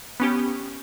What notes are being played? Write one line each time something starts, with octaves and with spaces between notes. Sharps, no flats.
B3 C#4 G4